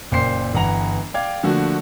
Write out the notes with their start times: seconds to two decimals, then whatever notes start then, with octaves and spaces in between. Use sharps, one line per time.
0.11 F#1 A#2 C5 G5 C6 C7
0.54 G1 E3 F#5 A#5 F7
1.14 D5 F5 G5 D6 G#6
1.43 D3 F3 A3 A#3 F#4